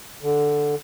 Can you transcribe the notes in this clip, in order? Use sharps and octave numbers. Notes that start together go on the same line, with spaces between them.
D3